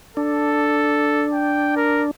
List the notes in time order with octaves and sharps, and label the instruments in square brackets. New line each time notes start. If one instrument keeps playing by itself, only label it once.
[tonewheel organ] D4 [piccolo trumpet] A4
[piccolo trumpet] G5
A#4